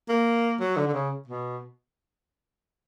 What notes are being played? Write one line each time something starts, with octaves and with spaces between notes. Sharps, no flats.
A#3
F#3
D3
D3
C#3
B2